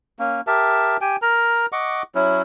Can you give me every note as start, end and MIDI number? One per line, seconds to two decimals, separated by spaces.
0.19 0.41 58
0.19 0.41 61
0.47 0.97 67
0.47 0.97 70
0.47 0.97 76
0.47 0.97 81
1.01 1.16 67
1.01 1.16 79
1.01 1.16 80
1.22 1.66 70
1.22 1.66 82
1.72 2.03 75
1.72 2.03 78
1.72 2.03 85
1.72 2.03 86
2.15 2.42 54
2.15 2.42 61
2.15 2.42 64